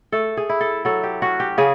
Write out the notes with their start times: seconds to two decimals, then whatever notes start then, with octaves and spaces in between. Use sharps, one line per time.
0.12 A3 A4
0.37 G#4
0.49 E4
0.61 A4
0.85 F#3 A4
1.03 G4
1.22 C#4 F#4
1.40 G4
1.58 C#3 G#4